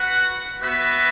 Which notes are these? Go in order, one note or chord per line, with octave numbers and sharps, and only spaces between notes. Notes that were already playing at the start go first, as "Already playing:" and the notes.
Already playing: F#4 B4 F#5
B3 F#4 B4 E5